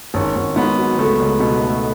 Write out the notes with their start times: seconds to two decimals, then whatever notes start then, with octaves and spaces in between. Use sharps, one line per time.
0.14 G#1 C#4
0.36 G#1
0.56 G#2 B3
0.78 F#3
0.98 C#2 A3
1.20 C#2
1.40 B2 B3
1.61 A3